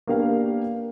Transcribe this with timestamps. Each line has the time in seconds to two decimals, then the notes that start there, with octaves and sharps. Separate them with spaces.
0.07 A#3 B3 D4 G4 A#4 F5